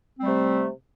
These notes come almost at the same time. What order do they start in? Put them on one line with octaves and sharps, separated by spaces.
C4 G3 A3 C3